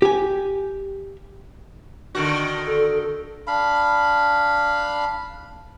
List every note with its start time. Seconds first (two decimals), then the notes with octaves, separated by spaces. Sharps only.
0.02 G4 G#5
2.15 D3 D#3 F#4
2.66 A4
3.47 D4 F5 B5